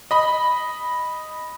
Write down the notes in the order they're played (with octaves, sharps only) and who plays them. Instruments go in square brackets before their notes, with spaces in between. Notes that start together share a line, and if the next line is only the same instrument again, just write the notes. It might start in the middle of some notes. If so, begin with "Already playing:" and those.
[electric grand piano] D#5 B5